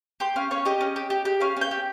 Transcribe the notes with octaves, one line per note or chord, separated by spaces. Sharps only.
G4 C6
C#4 F5
C#4 C#5
G4 D#5
C#4
G4
G4
G4
C#4 F5
C#4 G5
G4